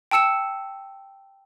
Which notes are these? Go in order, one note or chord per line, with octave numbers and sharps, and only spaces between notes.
G5 A5 E6 C#7 E7